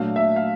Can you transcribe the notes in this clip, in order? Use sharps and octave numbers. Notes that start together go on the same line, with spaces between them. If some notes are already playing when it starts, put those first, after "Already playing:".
Already playing: A#2 F#3 A3 D4 F5
E5
F5